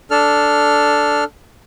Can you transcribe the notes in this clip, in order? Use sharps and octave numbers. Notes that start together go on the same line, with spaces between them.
D4 A4 F6